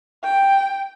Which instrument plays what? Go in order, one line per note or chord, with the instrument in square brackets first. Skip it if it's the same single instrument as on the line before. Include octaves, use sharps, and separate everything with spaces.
[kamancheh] G5